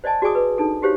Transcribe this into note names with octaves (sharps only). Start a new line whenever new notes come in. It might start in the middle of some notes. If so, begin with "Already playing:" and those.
C5 D5 D#5 G#5 A5
F#4 G#4 D5 G#5 D6 D#6
B4
D4 D#4 A4
F#4 G4 C5 C#5 F5